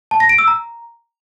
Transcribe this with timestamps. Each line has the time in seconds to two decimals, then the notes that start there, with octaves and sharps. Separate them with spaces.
0.11 A5
0.20 A#6
0.29 D7
0.38 E6
0.48 A#5